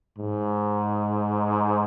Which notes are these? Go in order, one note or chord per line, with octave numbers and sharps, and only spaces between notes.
G#2